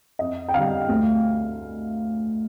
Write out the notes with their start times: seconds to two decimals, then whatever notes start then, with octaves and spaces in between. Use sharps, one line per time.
0.19 F2 D#5
0.48 G5
0.54 D3 G3 F5
0.89 D2